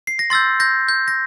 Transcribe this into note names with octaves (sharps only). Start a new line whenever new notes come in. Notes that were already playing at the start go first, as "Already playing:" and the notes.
C7
A#6
C6 E6 G6 A6
G6 A#6
G6
A#6